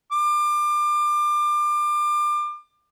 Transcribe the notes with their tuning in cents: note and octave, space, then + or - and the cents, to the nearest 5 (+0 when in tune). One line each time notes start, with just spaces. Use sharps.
D6 +30